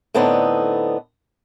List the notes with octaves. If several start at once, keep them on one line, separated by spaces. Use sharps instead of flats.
A2 D3 B3 C4 D4 D#4